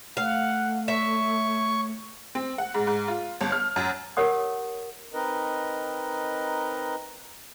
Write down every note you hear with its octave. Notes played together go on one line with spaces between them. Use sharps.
A3 F5 F#5
C#5 E5 C#6
C4
F#5
G#2
G#2
F4
G1
F6
F#2
G4 A#4 C#5 F#5 D#6
C4 D#4 A#4 B4 D#5